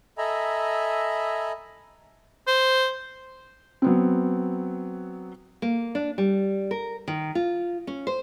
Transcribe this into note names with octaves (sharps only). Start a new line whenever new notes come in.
A4 D#5 E5 G#5 A#5 B5
C5
F#3 B3 C4
A#3
D4
G3
A#4
D#3
F4
C#4
C5